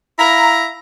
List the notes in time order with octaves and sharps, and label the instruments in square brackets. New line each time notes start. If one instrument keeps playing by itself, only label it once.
[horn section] E4 F5 A#5